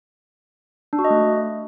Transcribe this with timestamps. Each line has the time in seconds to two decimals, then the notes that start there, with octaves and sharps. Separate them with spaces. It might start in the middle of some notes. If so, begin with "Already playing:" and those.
0.93 D4
0.99 F#4
1.05 D#5
1.10 A3